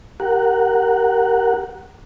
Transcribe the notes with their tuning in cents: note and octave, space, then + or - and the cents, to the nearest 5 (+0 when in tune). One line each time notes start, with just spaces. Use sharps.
G4 -15 A#4 +0 F#5 +0